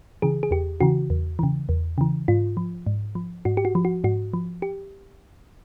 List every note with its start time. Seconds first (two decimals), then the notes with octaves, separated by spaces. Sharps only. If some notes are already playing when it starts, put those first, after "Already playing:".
0.22 C#3 E3 G#4
0.43 G#4
0.51 E2 G4
0.81 C#3 E3 F#4
1.10 E2
1.39 C#3 E3
1.69 E2
1.98 C#3 E3
2.28 G#2 F4
2.57 F3
2.87 G#2
3.15 F3
3.45 G#2 F#4
3.57 G4
3.65 F#4
3.75 F3
3.85 F#4
4.04 G#2 F#4
4.34 F3
4.62 G4